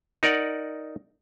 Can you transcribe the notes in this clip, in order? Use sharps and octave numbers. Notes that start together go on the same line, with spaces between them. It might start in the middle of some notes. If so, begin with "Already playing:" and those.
D#4 A#4 D5 F#5